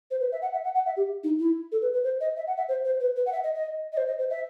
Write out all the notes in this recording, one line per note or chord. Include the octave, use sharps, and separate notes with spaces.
C5
B4
E5
F#5
E5
F#5
F#5
E5
G4
D#4
E4
A4
B4
B4
C5
D#5
E5
F#5
E5
C5
C5
B4
B4
F#5
E5
D#5
D#5
D#5
C5
D#5
C5
E5